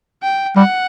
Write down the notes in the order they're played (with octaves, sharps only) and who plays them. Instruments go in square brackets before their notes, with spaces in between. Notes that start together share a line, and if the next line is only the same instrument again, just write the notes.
[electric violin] G5
[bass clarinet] G3 [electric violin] F#5